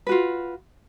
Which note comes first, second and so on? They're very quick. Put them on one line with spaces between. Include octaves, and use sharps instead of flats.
B4 F#4 F4